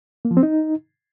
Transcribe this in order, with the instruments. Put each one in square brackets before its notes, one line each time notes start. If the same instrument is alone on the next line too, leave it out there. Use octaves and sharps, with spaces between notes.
[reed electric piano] A#3
F3
C4
D#4